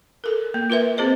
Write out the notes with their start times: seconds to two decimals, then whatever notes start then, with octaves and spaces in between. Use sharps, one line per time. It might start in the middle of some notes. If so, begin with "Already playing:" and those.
0.24 A4 A#4
0.54 A#3
0.70 F4 A#4 B4 E5
0.97 C4 F4 G#4 C5 D#5